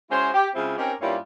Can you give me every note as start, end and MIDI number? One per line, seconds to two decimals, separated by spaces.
0.11 0.28 56
0.11 0.28 61
0.11 0.28 64
0.11 0.28 66
0.11 0.28 72
0.34 0.47 67
0.55 0.76 49
0.55 0.76 56
0.55 0.76 60
0.55 0.76 64
0.55 0.76 65
0.55 0.76 68
0.78 0.92 60
0.78 0.92 61
0.78 0.92 63
0.78 0.92 67
0.78 0.92 70
1.01 1.16 43
1.01 1.16 55
1.01 1.16 58
1.01 1.16 61
1.01 1.16 64
1.01 1.16 65